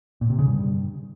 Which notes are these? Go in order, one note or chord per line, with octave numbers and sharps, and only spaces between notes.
A#2
C3
C#3
G2